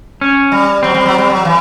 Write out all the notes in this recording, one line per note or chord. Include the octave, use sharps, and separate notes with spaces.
C#4
G3
F#3 C4
G3
F#3
G3
F#3
E3